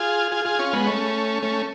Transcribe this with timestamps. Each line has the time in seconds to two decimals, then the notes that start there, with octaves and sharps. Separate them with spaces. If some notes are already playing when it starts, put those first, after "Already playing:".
Already playing: F4 G#4
0.31 F4 G#4
0.45 F4 G#4
0.59 C#4 F4
0.73 G#3 B3
0.86 A3 C#4
1.42 A3 C#4